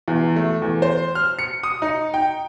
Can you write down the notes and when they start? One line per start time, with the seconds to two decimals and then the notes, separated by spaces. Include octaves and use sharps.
0.08 E2
0.36 A3
0.62 E2
0.82 C5
1.15 F6
1.39 C#7
1.63 D#6
1.82 D#4
2.14 G5